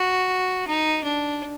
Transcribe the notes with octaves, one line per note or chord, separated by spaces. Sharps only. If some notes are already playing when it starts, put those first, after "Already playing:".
Already playing: F#4
D#4
D4